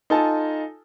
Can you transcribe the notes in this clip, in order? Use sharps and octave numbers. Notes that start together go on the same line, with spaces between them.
D#4 F4 A4 G#5 A5